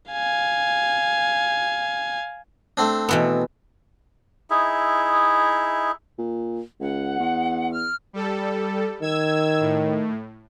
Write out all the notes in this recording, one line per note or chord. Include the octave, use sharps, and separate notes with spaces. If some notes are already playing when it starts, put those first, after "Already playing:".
F5 G#5
A3 C4 D4
B2 E3 B3
D#4 E4 G#4 E5
A#2
C#2 F#5
E2
F6
G3 A4
D#3 E6 G#6
A2